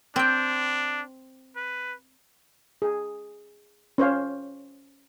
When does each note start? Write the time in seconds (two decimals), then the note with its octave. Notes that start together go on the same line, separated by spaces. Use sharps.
0.16 C4 D4 G5
1.56 B4
2.82 G#4
3.98 C#4 C5 C#5 F5